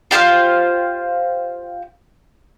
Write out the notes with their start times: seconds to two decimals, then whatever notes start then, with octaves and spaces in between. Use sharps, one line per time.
0.11 F4 G4 C5 F5